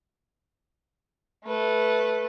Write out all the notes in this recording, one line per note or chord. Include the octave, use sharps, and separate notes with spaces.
A3 B4